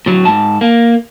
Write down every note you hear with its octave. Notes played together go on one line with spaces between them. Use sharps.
A2 F#3
G#2 A5
A#3